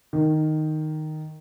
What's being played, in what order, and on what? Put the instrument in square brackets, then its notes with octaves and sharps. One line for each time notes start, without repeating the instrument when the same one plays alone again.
[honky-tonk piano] D#3